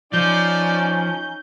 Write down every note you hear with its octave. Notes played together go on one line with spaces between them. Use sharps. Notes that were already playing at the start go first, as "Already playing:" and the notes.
F3 C#4 D#4 D5 G6